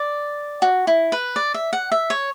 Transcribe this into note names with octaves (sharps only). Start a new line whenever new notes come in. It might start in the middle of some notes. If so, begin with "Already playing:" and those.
Already playing: D5
F#4
E4
B4
D5
E5
F#5
E5
C#5